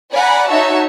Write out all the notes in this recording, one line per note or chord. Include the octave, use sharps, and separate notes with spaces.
D5 F#5 G#5 A#5 B5
D#4 F#4 C#5 E5 A5